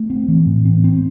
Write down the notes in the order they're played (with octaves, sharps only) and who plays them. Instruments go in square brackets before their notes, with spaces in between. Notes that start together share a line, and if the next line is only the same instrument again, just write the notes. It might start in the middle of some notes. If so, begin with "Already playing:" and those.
Already playing: [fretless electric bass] A3
C4
E3
A2
C4
C4